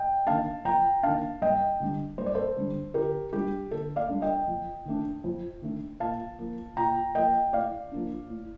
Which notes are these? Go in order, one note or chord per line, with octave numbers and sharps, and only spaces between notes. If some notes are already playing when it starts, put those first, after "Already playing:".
Already playing: D#5 G5
D#3 A#3 D4 F5 A5
F2 G5 A#5
D#3 A#3 D4 F5 A5
G2 D#5 G5
D3 G3 D4
G2 C5
D5
A4 C5
D3 G3 D4
D3 G4 A#4
G3 D4 G4
D3 A4
D5 F5
G3 D4
D#5 G5
F2
D#3 A3 D4
F2
D#3 A3 D4
A#2 F5 A5
F3 A#3
A#2 G5 A#5
F3 A#3 D#5 G5
A2 D5 F5
F3 A#3 D4
A2